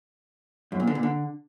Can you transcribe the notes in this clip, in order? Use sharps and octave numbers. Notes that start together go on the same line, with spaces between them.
F#2
A#2
D3
A#2
D3